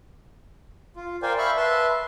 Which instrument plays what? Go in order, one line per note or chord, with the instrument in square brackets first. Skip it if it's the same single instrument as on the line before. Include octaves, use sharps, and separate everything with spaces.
[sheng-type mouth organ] F4
A#4 C5 D5 F5 G5 G#5
E5 F5 B5 C#6
B4 E5 A5 C6